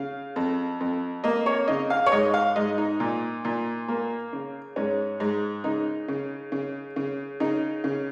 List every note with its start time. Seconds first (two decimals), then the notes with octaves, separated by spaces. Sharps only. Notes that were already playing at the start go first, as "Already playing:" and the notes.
Already playing: C#3 F5
0.36 F2
0.80 F2
1.24 A#3 D#5
1.46 C#5
1.68 C#3 D#5
1.90 F5
2.06 C#5
2.12 G#2 D#5
2.34 F5
2.56 G#2 D#5
2.78 D#4
3.00 A#2
3.45 A#2
3.88 A#3
4.33 C#3
4.76 G#2 C#4
5.20 G#2
5.64 C#3 D#4
6.08 C#3
6.52 C#3
6.96 C#3
7.40 C#3 D#4
7.84 C#3